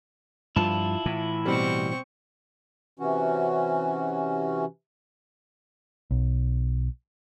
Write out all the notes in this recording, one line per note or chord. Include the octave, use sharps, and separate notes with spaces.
G2 F3 E4 F4 A5
A2 E3
B2 G3 C4 C#6
C3 E3 C#4 F#4
B1